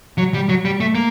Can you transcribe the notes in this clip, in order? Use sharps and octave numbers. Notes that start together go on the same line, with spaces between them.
F#3
G3
F#3
G3
A3
A#3